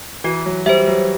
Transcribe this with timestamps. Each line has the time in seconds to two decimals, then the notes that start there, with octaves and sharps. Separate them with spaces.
0.24 E3 F#4
0.46 F#3
0.66 G3 C5 E5
0.88 F#3